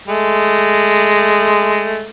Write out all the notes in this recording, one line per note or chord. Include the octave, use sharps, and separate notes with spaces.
G#3 A3